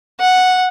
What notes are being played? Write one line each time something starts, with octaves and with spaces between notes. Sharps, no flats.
F#5